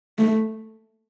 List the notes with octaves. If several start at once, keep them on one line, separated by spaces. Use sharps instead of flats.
A3